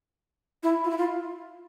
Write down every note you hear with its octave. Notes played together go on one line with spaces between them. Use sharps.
E4
F4
E4
F4